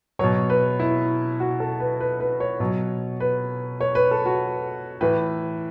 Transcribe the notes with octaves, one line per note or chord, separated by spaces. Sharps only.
B2 F#3 C#5
B4
E4
F#4
A4
B4
B4
B4
C#5
B2 F#3
B4
C#5
B4
A4
F#4
A2 E3 B4